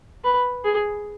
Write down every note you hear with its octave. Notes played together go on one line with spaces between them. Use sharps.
B4
G#4